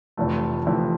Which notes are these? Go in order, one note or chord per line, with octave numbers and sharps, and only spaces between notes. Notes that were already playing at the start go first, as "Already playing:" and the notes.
F1 F2 E3 A3
F1 F2 E3 A3